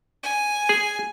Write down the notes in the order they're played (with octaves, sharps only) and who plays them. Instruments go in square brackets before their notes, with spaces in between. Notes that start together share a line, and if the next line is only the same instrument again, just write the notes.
[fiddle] G#5
[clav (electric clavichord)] G#4